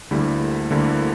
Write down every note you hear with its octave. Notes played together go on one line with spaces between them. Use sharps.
D2 D3 G3 A#3 E4
D2 D3 G3 A#3 E4